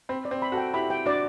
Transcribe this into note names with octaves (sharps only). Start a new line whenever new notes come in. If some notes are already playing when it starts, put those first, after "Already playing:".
C4 B5
D5
C4
B5
F#4 A4
G5
E4 G4 B5
G5
D4 F#4 D5